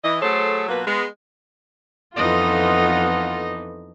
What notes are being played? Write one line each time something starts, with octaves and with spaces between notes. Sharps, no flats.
E3 D#5
F#3 A3 G#4 A4 C5 C#5
B2 F#3 A#3 F4 B4
G#3 B3
F2 E3 B3 D#4 F4 A4 D#5 F#5